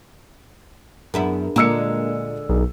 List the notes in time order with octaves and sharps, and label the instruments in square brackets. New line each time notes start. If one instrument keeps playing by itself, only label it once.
[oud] F#2 B3 E4 [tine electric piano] D4 G#4 A#4
[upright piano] A#2 E6 C#7 [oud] D3 G#3 A#3
[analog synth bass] B1 [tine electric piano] D#4 G#4 A#4